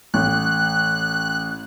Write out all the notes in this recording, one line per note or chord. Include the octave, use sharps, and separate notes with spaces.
A1 F#6